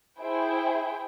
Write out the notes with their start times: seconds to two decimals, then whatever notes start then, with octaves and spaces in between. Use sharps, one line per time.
0.19 E4 G#4 C5 G5